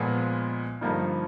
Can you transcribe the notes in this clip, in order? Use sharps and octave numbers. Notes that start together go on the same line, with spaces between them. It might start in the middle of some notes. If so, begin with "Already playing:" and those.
Already playing: A#2 F3 G#3 B3
G2 D3 F3 A#3 D#4